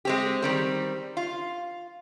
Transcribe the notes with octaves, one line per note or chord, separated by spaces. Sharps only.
G#3 C4 G4
D#3 G3 C4
F4